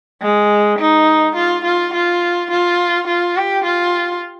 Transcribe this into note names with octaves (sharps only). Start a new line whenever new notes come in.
G#3
D#4
F4
F4
F4
F4
F4
G4
F4